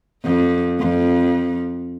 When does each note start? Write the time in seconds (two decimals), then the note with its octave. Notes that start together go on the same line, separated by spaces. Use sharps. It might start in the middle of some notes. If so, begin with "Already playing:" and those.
0.24 F2
0.79 F2